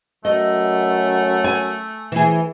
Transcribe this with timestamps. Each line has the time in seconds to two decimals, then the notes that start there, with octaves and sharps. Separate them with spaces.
0.25 F#2 A3 D#5
1.44 G#5
2.12 E3 G#4